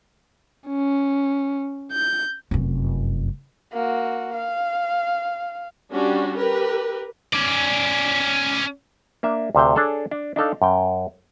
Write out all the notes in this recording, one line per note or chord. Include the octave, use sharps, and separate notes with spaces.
C#4
G6
F1 F#2
A#3 F#4
F5
G3 C#4 D4 F#4 G4
G4 A#4 B4
C#4 D5
A#3 D4 E5
D2 C3 C5 F5 G5
D4 G#4 A4 C#5
D4
D4 D#4 A4 F5
F#2 G5